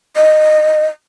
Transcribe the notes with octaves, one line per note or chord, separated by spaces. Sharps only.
D#5